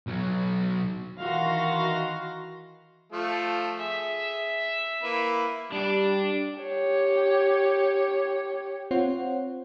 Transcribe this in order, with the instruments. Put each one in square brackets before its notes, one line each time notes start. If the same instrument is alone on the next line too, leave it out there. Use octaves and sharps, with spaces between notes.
[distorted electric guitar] B1 F#3
[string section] D#3 E3 F#4 F5 C6 A#6
[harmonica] F3 A3 F4
[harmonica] G#4 [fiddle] E5
[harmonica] A#3 E4 B4
[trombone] G3 [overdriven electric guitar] D4 D5
[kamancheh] G4 C#5
[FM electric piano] C4 F4 C5 C#5 F#5